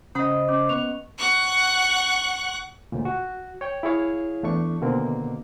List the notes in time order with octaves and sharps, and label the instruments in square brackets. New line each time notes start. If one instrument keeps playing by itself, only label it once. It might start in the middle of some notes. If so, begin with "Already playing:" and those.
[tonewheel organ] C#3 C5 [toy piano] C#4 F#5 E6 [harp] D#5 B5 [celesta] D#6
[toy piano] C#4 [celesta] D6
[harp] B3 C#6 [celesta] F7
[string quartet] F#5 C#6 F#6
[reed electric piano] D2 A#2
F#4
C#5 G5
E4 G#4 C#5 F5
E2 A3 D4 C#6
B2 D3 D#3 A#3 C4